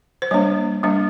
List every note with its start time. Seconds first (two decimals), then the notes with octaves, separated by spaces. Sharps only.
0.22 C5
0.31 G3 A#3 D4 C#5
0.83 G3 A#3 D4